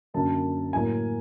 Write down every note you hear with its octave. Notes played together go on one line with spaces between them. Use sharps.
F#2 D3 F#3 A#3 A5
A2 F#3 A#3 G#5